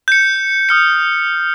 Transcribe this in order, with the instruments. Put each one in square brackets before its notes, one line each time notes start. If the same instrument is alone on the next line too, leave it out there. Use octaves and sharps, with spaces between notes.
[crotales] G6 C#7
D#6 F6 C#7